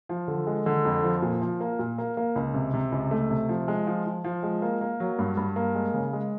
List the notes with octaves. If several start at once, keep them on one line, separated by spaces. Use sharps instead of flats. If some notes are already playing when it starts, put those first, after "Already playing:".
F3
D3
G#3
D3
F2
F3
A#2
F3
A#3
A#2
A#3
A#3
C#2
C3
C3
C#2
A3
C3
F3
G#3
F3
F3
F3
G#3
A#3
A#3
F#3
G2
G2
A#3
G#3
C#3
G#3